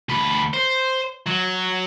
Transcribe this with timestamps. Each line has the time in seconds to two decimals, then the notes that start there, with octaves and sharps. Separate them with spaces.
0.09 D2 B4
0.54 C5
1.26 F#3